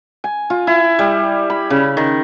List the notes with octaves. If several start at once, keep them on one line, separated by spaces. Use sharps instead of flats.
G#5
F4
E4
G3
B5
C#3
D#3